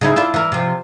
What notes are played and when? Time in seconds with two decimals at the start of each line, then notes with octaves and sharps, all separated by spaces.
0.01 C#3 D#4 E4
0.16 D4 E4 F4
0.34 E3 A#4
0.52 C3 F3